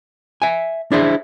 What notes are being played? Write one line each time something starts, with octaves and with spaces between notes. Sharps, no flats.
E5 G#5
D4 E4 G#4 C5 E5